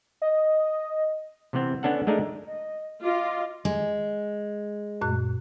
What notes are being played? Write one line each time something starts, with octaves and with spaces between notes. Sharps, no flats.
D#5
C3 E3 B3 C4
B3 C#4 D4 A4 F#5
G#3 A3 D4 D#4 A#4
D#5
F4 D#5 D6
G#3
F#2 A#2 F#6